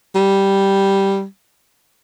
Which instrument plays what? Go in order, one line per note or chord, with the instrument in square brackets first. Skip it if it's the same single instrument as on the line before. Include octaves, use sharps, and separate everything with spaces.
[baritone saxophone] G3